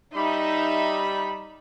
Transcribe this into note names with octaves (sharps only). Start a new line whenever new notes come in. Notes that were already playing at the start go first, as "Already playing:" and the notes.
G3 D#4 E5 B5